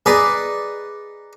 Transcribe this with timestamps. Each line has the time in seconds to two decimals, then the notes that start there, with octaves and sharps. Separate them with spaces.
0.06 D#4 G#4 B4 D5